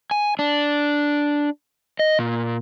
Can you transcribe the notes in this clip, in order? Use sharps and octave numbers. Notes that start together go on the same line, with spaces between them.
G#5
D4
D#5
A#2